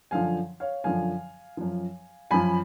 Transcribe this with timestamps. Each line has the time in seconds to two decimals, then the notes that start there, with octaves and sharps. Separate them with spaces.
0.11 F#2 D3 F3 F5 G#5
0.60 C#5 F5
0.84 F#2 D3 F3 F5 G#5
1.57 F#2 F3
2.31 F#2 F3 G#5 B5